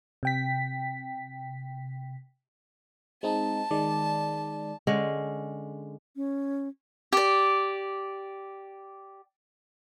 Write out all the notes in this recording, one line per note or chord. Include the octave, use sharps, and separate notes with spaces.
C3 G5 B6
G#3 C4 D#4 A5
D#3 G#3 D5
D3 G#3 C#4
C#4
G4 D5